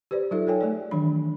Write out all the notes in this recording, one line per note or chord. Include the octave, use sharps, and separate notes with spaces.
G4 B4 C5 D5
F#3 D#4 F4 A4 E5
A4 A#4 C#5 G5 G#5
A3 G#4 D5
D#3 E3 F#3 D4 B5